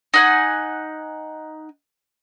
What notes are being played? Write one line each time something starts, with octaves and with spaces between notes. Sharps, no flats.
D#4 F#5 G#5